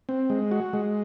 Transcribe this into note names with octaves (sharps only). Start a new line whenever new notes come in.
C4
G#3
F#4
G#3